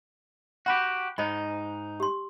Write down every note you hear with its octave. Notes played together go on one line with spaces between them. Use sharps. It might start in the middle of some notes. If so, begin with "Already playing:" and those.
F#4 G4 F#5 B5
G#2 D#4 C5 D#5 B5
G4 C6